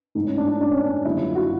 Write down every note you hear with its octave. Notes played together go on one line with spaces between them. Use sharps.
G#2 E3 A3 D#4
C#4
D4
D4
D4
C#4
D4
F#2 D3 G3 A#3 E4
F4
F#4